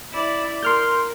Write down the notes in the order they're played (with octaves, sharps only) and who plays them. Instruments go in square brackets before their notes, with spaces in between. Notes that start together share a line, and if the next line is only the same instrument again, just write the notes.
[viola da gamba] E4 D5
[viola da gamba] A#4 [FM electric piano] C6 F6 G6